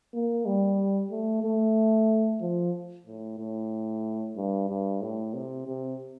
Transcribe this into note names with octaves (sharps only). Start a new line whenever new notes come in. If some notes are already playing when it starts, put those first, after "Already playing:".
A#3
G3
A3
A3
F3
A2
A2
G2
G2
A2
C3
C3